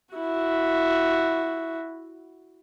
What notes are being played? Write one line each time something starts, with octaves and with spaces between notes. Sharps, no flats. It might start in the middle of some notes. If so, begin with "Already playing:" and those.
E4 F#4